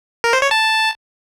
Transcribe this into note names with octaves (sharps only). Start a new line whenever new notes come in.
A#4
C5
C#5
A5